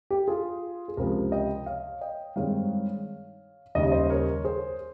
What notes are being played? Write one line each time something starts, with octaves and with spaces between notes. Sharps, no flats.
G4
F4 G#4
G#4
C#2 C3 F3 G4 A#4
D#5 G5
C#5 F5
D#5 G5
G2 D#3 G#3 C4 D#4 C#5 F5
D#2 C#3 G3 D#5
C#5
C5 D#5
A#4 C#5
G#4 C5